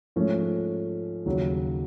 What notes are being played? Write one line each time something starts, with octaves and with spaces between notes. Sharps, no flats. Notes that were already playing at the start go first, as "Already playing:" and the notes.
G#2 F3 A3 C#4
D#2 C#3 F#3